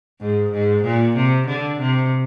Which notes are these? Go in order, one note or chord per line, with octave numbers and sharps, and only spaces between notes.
G#2
G#2
A#2
C3
D3
C3